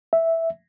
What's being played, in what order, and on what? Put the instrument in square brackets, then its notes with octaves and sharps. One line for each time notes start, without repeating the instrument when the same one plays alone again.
[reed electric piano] E5